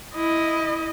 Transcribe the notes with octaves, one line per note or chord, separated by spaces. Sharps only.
E4 D#5